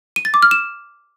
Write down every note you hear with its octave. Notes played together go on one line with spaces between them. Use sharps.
D#7
A6
D6
F6
E7